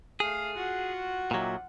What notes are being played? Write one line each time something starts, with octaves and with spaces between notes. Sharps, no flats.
A3 G#4 F5
F4 F#4 F#5
A#2 F#3 D#4 G4 E5